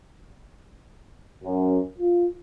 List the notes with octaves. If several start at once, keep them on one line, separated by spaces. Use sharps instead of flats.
F#2
F4